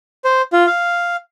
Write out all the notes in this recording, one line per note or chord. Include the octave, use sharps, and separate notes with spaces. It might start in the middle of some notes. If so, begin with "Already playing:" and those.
C5
F4
F5